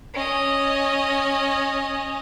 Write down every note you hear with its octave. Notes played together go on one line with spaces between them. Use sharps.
C#4 D#5